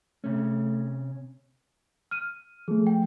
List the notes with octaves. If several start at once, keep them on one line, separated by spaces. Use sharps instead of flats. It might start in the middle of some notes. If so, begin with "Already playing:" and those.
C3 A3 C#4
F6 D#7
F3 A3 G#4
G5